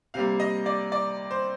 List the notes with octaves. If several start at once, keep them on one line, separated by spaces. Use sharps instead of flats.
C3 G3 A#3 F5
D#5
D5
D5
C5